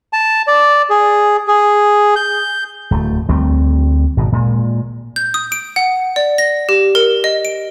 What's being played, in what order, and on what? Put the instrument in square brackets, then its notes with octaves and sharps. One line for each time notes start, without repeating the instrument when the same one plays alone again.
[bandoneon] A5
D5
G#4
G#4
G6
[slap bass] D1 A3
D2 G3 A3 C4
G#1 B2
A#2 G#3
[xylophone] G6
D#6
D7
F#5
D5
A#6
G4
A#4
D#5
D7